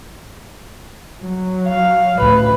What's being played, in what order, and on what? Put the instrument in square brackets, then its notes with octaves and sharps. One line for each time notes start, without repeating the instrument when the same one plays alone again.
[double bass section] F#3
[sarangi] F5
[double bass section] A1 D2 A2 [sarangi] B4